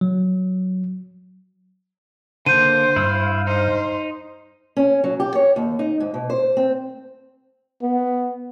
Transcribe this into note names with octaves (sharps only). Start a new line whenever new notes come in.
F#3
D3 A#3 C5 G6 D#7
G2 E4 F5 E6
D#4 C5
C#4
F#3
G4
C#5
D#2
D#4
G#2
B2
C5
C4
B3